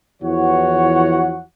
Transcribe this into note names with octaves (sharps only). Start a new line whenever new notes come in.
E2 E3 F3 F#4 C#5 F#5